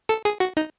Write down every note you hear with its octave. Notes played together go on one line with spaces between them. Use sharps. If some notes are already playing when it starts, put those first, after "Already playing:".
A4
G#4
F#4
D#4